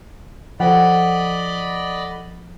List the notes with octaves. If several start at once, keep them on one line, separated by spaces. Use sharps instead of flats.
F3 A4 C5 D5 D#5 F#5 B5